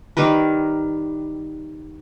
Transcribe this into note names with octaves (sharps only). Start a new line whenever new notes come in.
D#3 G3 A#4 B4